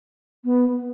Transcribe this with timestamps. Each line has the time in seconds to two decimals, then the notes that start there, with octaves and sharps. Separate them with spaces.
0.45 B3